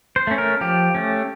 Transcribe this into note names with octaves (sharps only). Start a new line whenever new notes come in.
C5
A3 C#4
A#4
F3 G4
A3 C#4